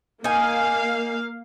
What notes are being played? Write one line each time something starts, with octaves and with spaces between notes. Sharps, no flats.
A#3 D#4 F5 G#5